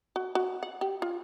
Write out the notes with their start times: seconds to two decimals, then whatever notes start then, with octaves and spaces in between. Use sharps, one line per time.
0.16 F#4
0.35 F#4
0.63 F#5
0.81 G4
1.02 F4